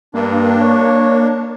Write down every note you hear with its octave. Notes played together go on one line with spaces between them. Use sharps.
G2 A#3 D4
C#5